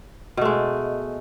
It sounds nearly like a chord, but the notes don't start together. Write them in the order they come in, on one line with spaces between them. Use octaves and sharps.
B2 A3 G#3